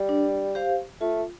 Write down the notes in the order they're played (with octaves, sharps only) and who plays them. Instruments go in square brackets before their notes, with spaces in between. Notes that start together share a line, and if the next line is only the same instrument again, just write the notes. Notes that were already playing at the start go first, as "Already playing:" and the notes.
Already playing: [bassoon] G3
[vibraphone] D4
G4 C5 F5
[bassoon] A3 [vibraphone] F4